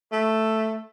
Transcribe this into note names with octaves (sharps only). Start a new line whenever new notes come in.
A3